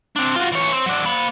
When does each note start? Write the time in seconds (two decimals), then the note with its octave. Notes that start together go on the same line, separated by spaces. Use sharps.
0.16 C4 D4
0.36 F4 F#4
0.52 E3 C#5
0.72 C4
0.86 F#3 D4
1.05 A#3 B5